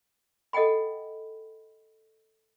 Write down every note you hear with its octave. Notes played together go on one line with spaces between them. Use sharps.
A4 D#5 F#5 G5 B5